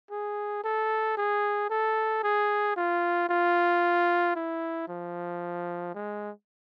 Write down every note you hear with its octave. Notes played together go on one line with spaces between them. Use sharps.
G#4
A4
G#4
A4
G#4
F4
F4
E4
F3
G#3